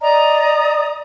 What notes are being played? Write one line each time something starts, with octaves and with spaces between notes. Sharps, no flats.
D5 D#5 A#5 D#6